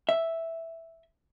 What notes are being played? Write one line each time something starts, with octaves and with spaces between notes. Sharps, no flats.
E5